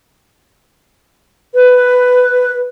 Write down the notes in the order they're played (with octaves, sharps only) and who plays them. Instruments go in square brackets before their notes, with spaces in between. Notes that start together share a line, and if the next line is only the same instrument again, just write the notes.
[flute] B4